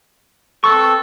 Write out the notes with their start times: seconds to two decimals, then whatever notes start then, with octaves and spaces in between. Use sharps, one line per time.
0.64 C4 A4 B4 C#6